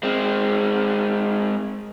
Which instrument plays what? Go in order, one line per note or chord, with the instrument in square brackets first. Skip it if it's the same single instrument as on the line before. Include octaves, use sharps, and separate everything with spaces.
[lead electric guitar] G#3 C4